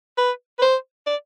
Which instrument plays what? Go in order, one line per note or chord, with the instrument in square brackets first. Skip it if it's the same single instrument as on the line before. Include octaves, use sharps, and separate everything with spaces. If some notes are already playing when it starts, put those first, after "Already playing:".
[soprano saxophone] B4
B4
C5
D5